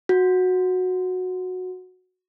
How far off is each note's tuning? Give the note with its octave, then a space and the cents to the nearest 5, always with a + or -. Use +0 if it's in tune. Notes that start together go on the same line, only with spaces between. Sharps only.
F#4 -10